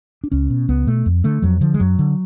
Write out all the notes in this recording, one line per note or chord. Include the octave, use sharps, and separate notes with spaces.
D4
C#2 C#4
B2
C#2 B3
B2 A3
F2
D3 A3
F2 F#3
D3 F3
G#3
F#2 F#3
D3